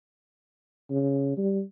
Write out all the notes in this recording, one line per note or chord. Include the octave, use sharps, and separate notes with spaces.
C#3
G3